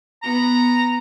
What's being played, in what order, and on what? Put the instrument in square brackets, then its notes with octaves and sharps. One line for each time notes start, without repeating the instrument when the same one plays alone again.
[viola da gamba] B3 [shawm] A#5